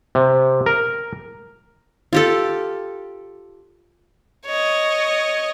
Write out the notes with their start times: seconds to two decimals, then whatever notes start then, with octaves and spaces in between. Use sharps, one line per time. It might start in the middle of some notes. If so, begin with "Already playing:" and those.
0.15 C3
0.66 A#4
2.13 F4 G4 A4
4.46 C#5 D#5